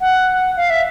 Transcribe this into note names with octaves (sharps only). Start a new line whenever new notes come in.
F#5
F5
E5